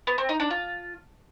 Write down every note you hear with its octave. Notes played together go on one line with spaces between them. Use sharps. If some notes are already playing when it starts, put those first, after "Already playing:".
B3
C4
D#4
D4
F4